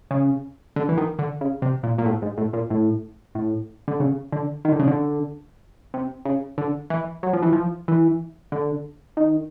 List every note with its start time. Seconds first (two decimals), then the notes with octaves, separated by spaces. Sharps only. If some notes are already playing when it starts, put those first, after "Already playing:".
0.11 C#3
0.76 D3
0.89 E3
0.98 D#3
1.19 D3
1.41 C#3
1.62 C3
1.83 A#2
1.98 A#2
2.06 A2
2.22 G#2
2.38 A2
2.53 A#2
2.70 A2
3.35 A2
3.88 D3
4.00 C#3
4.32 D3
4.65 D#3
4.72 D3
4.79 C#3
4.88 D3
5.94 C3
6.25 C#3
6.58 D3
6.90 E3
7.23 F#3
7.33 F3
7.42 E3
7.52 F3
7.88 E3
8.52 D3
9.17 D#3